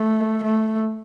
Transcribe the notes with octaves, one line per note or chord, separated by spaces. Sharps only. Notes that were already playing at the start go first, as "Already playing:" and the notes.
Already playing: A3
A3